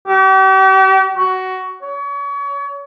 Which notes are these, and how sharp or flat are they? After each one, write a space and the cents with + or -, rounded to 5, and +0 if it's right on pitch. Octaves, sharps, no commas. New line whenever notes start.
G4 -40
F#4 +15
C#5 +35